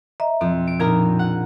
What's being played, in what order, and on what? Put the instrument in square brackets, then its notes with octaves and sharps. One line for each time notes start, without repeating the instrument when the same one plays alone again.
[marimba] D#5 E5 A#5
[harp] F2 [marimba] B2 C4
[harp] D7
[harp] A#1 A#4 A#5 [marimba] F3 D#4 F4
[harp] F#5